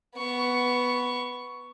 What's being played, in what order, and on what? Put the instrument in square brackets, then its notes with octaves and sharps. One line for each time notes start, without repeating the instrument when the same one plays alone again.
[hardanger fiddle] B3 C#6